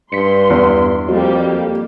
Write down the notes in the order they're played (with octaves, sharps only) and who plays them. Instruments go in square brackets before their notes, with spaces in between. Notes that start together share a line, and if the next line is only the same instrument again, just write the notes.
[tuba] G2 [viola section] C6 [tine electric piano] B6 C#7
[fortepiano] E2
[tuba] F2 [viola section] G3 A#3 G4 [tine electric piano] F#4